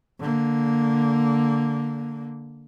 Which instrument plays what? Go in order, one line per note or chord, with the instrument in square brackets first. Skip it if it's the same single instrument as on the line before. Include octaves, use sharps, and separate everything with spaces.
[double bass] D3 A#3